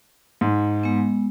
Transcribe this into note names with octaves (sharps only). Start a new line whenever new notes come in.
G#2
G#3 B3